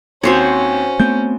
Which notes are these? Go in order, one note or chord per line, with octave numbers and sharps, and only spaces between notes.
D#2 C4 C#4 F#4 C5 C#5
A3 B3 C4 G6